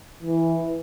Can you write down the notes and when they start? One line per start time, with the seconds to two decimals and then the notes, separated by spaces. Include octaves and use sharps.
0.23 E3